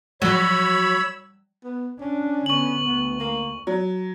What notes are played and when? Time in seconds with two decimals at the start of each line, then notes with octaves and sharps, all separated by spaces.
0.22 F3 F#3 G#3 C#5 B5 E6
1.64 B3
2.01 C#4 D4
2.46 D3 B3 C#6 F#7
2.85 D2 B3
3.20 A#3
3.67 F#3